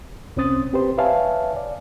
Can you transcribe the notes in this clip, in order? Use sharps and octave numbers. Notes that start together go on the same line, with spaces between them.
C2 C4 C#4 C5 D#6 A6
C4 G4 B4 C5
B4 C#5 E5 F5 G#5 A5
D5